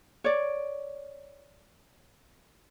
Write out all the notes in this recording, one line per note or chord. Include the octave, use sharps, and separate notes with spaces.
C#5 D5